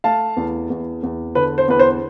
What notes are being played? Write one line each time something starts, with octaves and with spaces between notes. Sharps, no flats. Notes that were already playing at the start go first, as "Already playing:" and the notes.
A3 F5 A5
E2
E2
E2
D3 B4
C5
E2 B4
C5